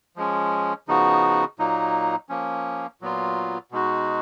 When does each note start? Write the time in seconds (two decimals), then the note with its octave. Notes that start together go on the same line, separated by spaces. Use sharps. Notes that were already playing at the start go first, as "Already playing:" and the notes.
0.16 F3 G#3 C#4
0.88 C#3 F3 B3 D#4 F#4
1.59 A#2 F#3 A#3 D#4
2.29 F3 A#3 C#4
3.01 A#2 F#3 B3 F4
3.71 B2 G#3 D#4 F#4